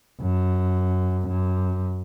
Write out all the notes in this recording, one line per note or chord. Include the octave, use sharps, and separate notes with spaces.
F#2
F#2